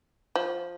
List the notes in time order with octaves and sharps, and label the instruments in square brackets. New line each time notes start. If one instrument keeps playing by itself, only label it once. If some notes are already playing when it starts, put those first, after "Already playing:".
[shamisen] F3